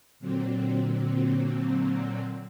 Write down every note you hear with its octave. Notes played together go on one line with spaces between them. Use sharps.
A#2 D3 F#3 C4